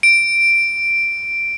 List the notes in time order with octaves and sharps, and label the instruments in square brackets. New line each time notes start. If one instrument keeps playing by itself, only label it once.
[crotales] D7